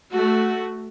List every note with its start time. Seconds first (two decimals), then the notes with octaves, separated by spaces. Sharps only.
0.12 A3 F#4